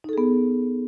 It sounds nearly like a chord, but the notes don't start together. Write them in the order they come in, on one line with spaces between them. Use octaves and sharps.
D#4 A4 G#4 B3